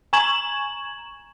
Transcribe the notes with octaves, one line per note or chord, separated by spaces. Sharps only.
G#5 A#5 C#6 G#6 E7 F#7